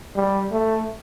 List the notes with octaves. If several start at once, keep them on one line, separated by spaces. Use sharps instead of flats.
G3
A3